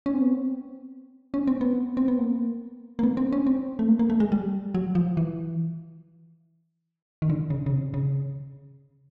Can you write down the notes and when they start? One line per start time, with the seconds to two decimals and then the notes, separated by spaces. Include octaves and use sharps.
0.06 C#4
0.14 C4
0.21 B3
0.30 C4
1.34 C#4
1.47 C4
1.61 B3
1.97 C4
2.08 B3
2.18 A#3
2.99 A#3
3.03 B3
3.17 C4
3.33 C#4
3.47 C4
3.79 A3
3.88 A#3
3.99 A#3
4.10 A3
4.20 G#3
4.32 G3
4.74 F#3
4.95 F3
5.17 E3
7.22 D#3
7.30 D3
7.50 C#3
7.66 C#3
7.73 C3
7.94 C#3